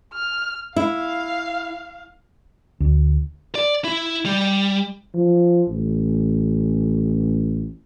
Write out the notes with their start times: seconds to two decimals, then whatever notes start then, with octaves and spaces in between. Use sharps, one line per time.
0.13 F6
0.76 E4 F5
2.80 D2
3.55 D5
3.85 E4
4.26 G3
5.14 F3
5.69 A1